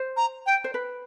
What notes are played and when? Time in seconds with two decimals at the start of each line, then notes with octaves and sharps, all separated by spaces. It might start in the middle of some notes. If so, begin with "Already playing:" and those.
Already playing: C5
0.17 A#5
0.46 G5
0.64 C5
0.74 B4